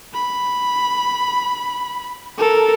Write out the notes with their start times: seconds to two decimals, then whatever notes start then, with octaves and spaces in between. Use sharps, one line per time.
0.14 B5
2.38 A4 A#4